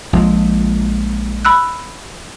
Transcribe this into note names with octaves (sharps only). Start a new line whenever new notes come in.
A#1 F3 G#3
B5 E6 F#6